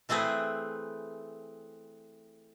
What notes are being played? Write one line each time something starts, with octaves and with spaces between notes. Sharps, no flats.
E3 A3 C4 G#4 B4